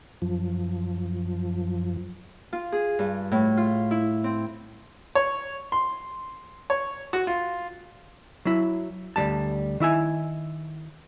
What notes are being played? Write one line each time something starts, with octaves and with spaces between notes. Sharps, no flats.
F#2 F3
F4
G#4
G2
A2
F4
E4
C4
C#5
C6
C#5
F#4
F4
F#3 E4
D2 E3 G3 A5
D#3 E4 E5 G#5